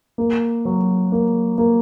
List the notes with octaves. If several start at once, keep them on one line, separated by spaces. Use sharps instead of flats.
A#3
F#3
A#3
A#3